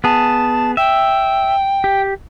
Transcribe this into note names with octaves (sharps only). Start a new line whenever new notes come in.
B3 G#4 A5
E5 G5
G4